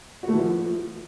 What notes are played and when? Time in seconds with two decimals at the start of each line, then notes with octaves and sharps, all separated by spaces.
0.23 F#4
0.28 A3
0.34 E3
0.39 F3